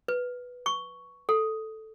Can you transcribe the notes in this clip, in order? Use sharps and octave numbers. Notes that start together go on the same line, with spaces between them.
B4
C#6
A4